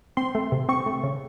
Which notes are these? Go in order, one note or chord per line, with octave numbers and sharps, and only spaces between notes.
C4 C6
A3
C3
C4 C#6
A3
C#3